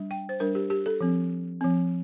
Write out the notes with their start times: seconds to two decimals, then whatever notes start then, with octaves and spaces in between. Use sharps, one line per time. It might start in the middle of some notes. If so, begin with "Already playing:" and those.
Already playing: G3 D4
0.11 G5
0.29 C5
0.40 G3 D4 A#4
0.55 G4
0.70 G4
0.86 A4
1.01 F3 C4
1.61 F3 C4